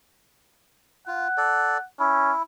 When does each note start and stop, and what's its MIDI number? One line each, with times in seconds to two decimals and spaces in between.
1.07 1.28 65
1.07 1.85 78
1.37 1.77 69
1.37 1.77 74
2.00 2.32 61
2.00 2.42 64